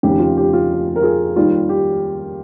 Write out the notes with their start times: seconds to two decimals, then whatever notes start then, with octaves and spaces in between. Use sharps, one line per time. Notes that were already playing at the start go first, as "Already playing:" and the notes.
0.03 F1 D#2 C#3 G4
0.19 F4
0.37 G4
0.53 F4
0.96 A#4
1.03 F4 G#4
1.36 D#2 D#3 G3 F4
1.69 G4